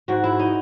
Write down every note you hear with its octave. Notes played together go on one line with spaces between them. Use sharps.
G#2 F#4
E4
D#4